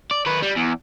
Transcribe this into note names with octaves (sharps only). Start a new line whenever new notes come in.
D5
D#3 B4
G3
E2